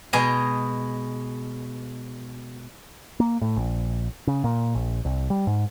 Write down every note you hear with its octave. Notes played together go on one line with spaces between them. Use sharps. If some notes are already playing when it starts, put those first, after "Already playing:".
B2 G#3 G#4 D#5 G#5
A#3
A2
A#1
C#3
A#2
A#1
C2
G3
G#2